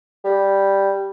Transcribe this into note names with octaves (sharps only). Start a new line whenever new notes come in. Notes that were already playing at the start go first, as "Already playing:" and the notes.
G3